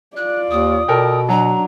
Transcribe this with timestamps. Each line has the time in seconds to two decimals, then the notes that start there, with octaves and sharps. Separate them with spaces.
0.16 F4 D5 F#6
0.51 D#2 D#6
0.88 B2 A4 A#4 G5
1.29 F#3 D4 A#5